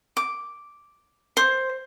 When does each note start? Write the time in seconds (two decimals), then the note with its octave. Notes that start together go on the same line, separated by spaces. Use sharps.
0.17 D6
1.37 C5